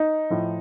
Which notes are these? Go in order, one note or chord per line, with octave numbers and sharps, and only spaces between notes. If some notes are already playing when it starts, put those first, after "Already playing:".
Already playing: D#4
A2 F3